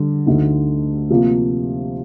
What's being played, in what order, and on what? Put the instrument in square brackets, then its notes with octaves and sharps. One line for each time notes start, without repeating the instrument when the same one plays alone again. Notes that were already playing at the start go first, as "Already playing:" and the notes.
Already playing: [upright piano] D3 G3
D2 D3 A3 D#4
C3 F3 A#3 F4